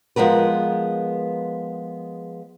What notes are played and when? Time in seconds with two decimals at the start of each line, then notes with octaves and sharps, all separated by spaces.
0.16 F3 G#3 B3 A#4 B4